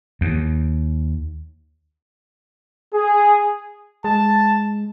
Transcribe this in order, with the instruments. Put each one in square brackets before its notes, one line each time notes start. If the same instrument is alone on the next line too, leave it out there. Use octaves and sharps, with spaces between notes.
[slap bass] D#2
[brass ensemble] G#4
[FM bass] G#3 [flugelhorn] A5